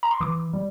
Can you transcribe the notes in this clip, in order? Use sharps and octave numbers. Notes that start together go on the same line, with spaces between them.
A#5
C6
E3 D6
G3